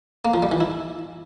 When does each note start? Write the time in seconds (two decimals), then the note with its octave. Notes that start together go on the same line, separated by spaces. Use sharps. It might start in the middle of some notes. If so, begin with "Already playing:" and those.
0.25 A#3
0.34 F3
0.43 G3
0.51 E3
0.60 E4